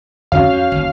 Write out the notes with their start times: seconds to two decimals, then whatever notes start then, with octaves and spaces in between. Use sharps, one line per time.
0.32 F2 D3 C4 C#4 F#4 C#5 F5
0.52 F2
0.72 G1 D#2